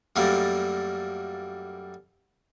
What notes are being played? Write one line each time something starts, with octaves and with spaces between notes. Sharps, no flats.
F#2 G3 A3 A#3